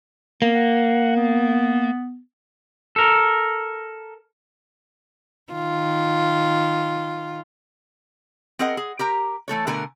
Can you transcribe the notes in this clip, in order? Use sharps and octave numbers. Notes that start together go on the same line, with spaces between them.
A#3 B3
F#5
B3
A4 A#4
D#3 F4
C4 G#4 A#4 D#5 F#5
G#4
G4 A#4 A#5
E3 A3 A4 C#5
B2 D3 A3 A#4 G#5 A#5